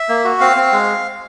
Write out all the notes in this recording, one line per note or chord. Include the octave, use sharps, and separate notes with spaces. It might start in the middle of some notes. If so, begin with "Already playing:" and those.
Already playing: E5
A#3
F#4
C4 F5
C4
G#3